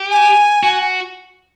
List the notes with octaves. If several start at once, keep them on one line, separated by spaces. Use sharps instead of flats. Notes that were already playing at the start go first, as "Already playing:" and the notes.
Already playing: G4
G#5
F#4